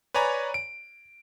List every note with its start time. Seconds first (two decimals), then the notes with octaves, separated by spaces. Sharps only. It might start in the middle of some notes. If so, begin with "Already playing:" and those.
0.14 B4 C#5 D5 G#5 A#5
0.54 D7